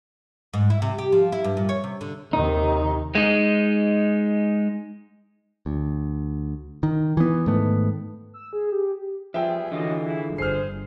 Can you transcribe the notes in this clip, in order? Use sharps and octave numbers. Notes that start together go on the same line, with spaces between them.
G#2
E4
C3
G4
F3
E4
G2
A#2
C#5
C3
D3
D#2 C3 D#3 D#4
G#3 D#4
D2
D#3
E3 B3
G#2 D#3 A3 B3
E6
G#4
G4
F3 G3 B3 G#4 E5 G5
D3 E3 C#4 F4 F#4 D#5
E4 G#4
G1 G#4 C5 F6 C7